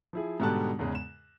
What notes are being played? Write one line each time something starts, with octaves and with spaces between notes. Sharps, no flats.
F3 E4 G#4
G#2 B2 D3 G3 A5 F#6
E2 G#2 C#3 G#3
E7